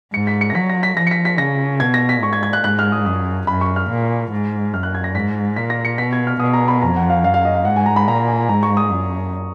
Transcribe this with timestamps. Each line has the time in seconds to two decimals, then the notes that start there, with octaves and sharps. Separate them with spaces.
0.14 G#2 C#7
0.27 B6
0.41 C#7
0.50 A#6
0.55 F#3 B6
0.69 A#6
0.83 B6
0.97 F3 A#6
1.07 C#7
1.11 B6
1.25 B6
1.38 C#3 A#6
1.80 B2 G#6
1.94 A#6
2.09 B6
2.23 G#2 C#6
2.33 G#6
2.43 G#6
2.53 F#6
2.64 G#2 F#6
2.79 F6
2.92 D#6
3.06 F#2 D#6
3.47 F#2 B5
3.61 C#6
3.76 F6
3.90 A#2
4.31 G#2
4.73 F#2 F6
4.83 F#6
4.95 G#6
5.04 A#6
5.14 G#2 B6
5.56 A#2 B6
5.70 A#6
5.85 C#7
5.98 B2 B6
6.13 G#6
6.27 F6
6.40 B2 D#6
6.54 A#5
6.68 B5
6.82 F2 A#5
6.96 F#5
7.10 F5
7.23 F#2 F5
7.34 F5
7.45 D#5
7.55 F5
7.65 G#2 F#5
7.76 G#5
7.86 A#5
7.96 B5
8.08 A#2 A#5
8.28 G#5
8.49 G#2 A#5
8.63 C#6
8.77 D#6
8.90 F#2